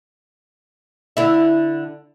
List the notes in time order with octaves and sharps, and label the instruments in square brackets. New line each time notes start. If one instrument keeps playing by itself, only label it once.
[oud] D3 E4